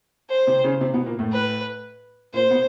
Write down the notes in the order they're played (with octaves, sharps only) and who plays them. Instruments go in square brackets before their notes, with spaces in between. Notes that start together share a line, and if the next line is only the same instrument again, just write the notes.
[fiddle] C5
[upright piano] C3 C4
C#3 C#4
C3 C4
B2 B3
A#2 A#3
A2 A3
[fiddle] B4
[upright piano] A#2 A#3 [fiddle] C5
[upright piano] B2 B3